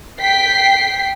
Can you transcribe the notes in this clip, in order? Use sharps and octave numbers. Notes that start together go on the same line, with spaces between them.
G5 B6 C7